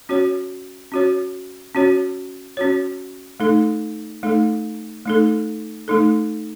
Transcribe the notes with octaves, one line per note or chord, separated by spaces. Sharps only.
C#4 F#4 C#5
C#4 F#4 C#5
C#4 F#4 C#5
C#4 F#4 C#5
A3 D#4 A4
A3 D#4 A4
A3 D#4 A4
A3 D#4 A4